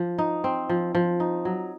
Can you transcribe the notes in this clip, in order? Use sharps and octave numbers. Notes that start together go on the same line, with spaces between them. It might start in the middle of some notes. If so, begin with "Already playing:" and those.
Already playing: F3
D#4
C4
F3
F3
D#4
F#3